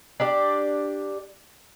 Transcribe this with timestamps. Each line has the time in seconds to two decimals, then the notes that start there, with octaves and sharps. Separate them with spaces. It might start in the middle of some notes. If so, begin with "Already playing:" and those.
0.20 D4 G4 D5